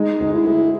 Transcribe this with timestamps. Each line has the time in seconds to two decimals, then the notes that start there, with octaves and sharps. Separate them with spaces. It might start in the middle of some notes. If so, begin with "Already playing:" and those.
Already playing: G#3 D#4
0.20 D2
0.33 E4
0.47 G#3